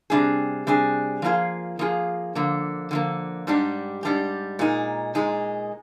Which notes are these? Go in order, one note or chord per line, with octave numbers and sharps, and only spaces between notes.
C3 G3 D4 G#4
C3 G3 D4 G#4
F3 A#3 F4 G#4
F3 A#3 F4 G#4
D3 F3 A#3
D3 F3 A#3
G#2 G3 D4 G4
G#2 G3 D4 G4
A#2 G#3 D#4
A#2 G#3 D#4